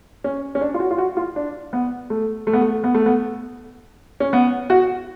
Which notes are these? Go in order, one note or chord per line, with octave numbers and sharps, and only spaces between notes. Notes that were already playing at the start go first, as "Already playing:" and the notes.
C#4
C#4
D4
F4
F#4
F4
F#4
F4
D4
B3
A3
A3
B3
A3
B3
A3
B3
C#4
B3
F#4